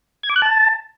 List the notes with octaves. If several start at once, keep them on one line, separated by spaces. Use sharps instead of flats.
G#6
D6
F#6
A5